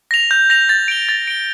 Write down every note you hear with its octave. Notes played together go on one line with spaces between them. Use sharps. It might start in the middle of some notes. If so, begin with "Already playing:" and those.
A#6 F7
G6
A#6 F7
A6
D7 G7
A6
D7 G7